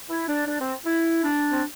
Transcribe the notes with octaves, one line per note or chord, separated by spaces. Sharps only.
E4
D4
D4
C4
E4
D4
C4